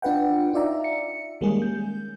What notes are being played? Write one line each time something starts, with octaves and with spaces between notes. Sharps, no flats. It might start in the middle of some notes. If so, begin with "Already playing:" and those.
D4 F4 B4 F#5 G5
D#4 F4 D5 E5 A#5
C#7
D#3 G3 G#3 A#3 C#4 G#4
G6